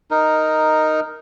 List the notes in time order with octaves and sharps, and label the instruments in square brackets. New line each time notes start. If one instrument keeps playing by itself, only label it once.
[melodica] D#4 A#4